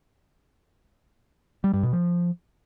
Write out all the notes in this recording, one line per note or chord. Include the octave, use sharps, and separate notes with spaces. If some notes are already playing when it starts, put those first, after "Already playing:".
G3
G2
B2
F3